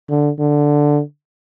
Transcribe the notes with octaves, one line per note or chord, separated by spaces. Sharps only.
D3
D3